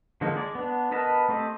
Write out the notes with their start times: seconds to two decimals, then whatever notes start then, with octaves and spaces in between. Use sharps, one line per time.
0.21 D3 F3 G#3 A#3 D#4
0.36 G#3 D5
0.55 B3 D4
0.91 B3 A#4 B4 D#5 A5
1.29 A3 C4 G4 D#5